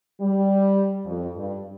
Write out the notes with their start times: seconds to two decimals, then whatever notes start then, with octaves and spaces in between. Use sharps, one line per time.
0.20 G3
1.05 F2
1.37 G2